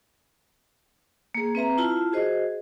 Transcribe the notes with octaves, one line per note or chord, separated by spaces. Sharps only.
A#3 G#4
C4 B4 E5 A#5
E4 F4 A5
F#4 G#4 C5 D#5